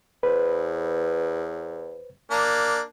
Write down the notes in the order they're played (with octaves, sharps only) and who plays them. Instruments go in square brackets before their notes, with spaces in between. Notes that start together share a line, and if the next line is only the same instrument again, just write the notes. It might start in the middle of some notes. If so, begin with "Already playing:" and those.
[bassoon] E2 [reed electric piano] B4 C5
[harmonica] A#3 D4